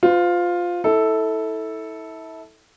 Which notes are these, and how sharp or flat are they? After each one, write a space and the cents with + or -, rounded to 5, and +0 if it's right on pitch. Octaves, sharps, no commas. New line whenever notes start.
F4 +10 C5 -40
E4 -30 A4 +0